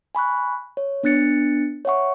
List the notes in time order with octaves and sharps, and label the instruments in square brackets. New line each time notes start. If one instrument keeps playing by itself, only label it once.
[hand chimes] G#5 B5 C#6 F#6
C#5
B3 D4 F#6 A6 C#7
C#5 E5 F#5 C#6